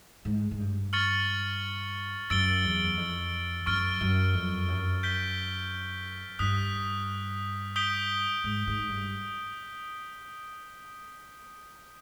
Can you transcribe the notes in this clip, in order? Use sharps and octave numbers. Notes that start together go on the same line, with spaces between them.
G#2
G#2
G2
C#6 F6 A6 C#7 F#7
F#2 E6 A6 D7 G7
E2
F2
F#2 C#6 F6 A6 D7
F#2
F2
F#2
G6 B6 D7 G7
G2 D#6 F#6 B6
D#6 G6 B6 D7 G7
G#2
G#2
G2